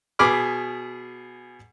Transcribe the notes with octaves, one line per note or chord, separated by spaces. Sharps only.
B2 G#4 B5 D6 F6